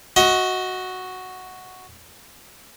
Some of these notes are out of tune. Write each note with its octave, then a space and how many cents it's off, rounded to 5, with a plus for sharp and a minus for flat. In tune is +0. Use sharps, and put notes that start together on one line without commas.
F#4 +0 D#5 +25